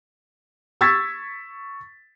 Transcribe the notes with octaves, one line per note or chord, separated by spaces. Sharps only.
C#6 E6 G#6 A6 B6